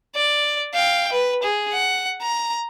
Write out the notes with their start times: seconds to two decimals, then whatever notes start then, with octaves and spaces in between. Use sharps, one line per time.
0.15 D5
0.74 F5 G5
1.12 B4
1.43 G#4
1.72 F#5
2.22 A#5